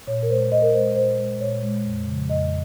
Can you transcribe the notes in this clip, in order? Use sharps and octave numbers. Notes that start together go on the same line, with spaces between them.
A#2 C#5
A#4
G#3 C5
A#2 D#5
A#4
G#3 C5
A#2 C5
G#3
A#2 C#5
G#3
F2
C#3 F3
F2 D#5